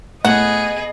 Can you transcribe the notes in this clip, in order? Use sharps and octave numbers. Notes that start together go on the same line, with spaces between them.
A2 B3 G#4 D#5 F#5